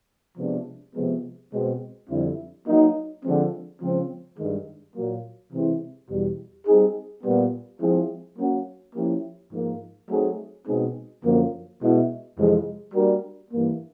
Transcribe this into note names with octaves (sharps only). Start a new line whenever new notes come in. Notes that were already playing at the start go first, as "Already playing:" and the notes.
C3 F3 G#3 B3 D4
C3 F3 G#3 B3
B2 G#3 C4
F2 D3 G3 C4 E4
F#3 A#3 D#4
D3 F3 G#3 C4
C#3 F3 G#3 C4
G2 D#3 G#3
A#2 F#3 A#3
C3 E3 G#3 C4 E4
E2 B2 G3
G3 C4 D#4 G#4
A#2 G3 B3
F3 G#3 C4 E4 G#4
F#3 A#3 C#4 F#4
F3 A#3 C#4 E4 G4
G#2 F3 A#3
F#3 A3 C4 D#4 G#4
B2 G#3 C4 D#4 G#4
F#2 D3 F3 A#3
B2 G#3 B3 E4
F2 C3 E3 G#3
G3 A#3 D4 F#4 A#4
G2 E3 G3 A#3